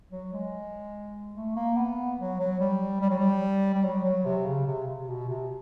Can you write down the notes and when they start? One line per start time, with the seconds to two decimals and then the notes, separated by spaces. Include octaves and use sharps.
0.12 F#3
0.33 G#3
1.35 A3
1.56 A#3
1.76 B3
2.19 F#3
2.40 F#3
2.60 G3
3.01 G3
3.10 F#3
3.18 G3
3.74 G3
3.85 F#3
4.04 F#3
4.25 C3
4.46 C#3
4.67 C3
4.87 C3
5.08 B2
5.29 C3